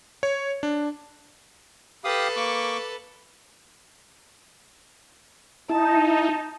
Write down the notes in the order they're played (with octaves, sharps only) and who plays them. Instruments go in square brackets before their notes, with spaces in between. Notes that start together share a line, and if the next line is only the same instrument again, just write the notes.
[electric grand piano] C#5
D4
[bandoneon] G4 F5 D#6 [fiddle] A4 B4
[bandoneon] A#3 C#6 D6
[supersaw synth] D#4 [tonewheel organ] E4 [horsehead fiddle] A5